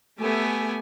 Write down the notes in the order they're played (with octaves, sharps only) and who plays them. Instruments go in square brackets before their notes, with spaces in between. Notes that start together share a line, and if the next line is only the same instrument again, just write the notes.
[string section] A3 G#5 [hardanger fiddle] B3 G4